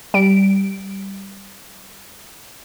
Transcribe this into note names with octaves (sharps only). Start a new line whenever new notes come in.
G3 D7